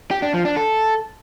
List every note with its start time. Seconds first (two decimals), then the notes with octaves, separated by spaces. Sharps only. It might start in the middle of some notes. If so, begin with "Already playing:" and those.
0.11 G4
0.22 D4
0.34 F3
0.45 D4
0.56 A4